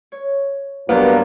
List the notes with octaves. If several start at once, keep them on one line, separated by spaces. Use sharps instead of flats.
C#5
G2 F#3 A#3 B3